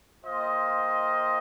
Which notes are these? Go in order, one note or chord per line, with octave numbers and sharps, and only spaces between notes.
A#3 F4 C5 D#5 G5